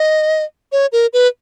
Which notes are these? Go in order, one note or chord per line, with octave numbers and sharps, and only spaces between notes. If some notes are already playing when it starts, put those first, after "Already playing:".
Already playing: D#5
C#5
A#4
B4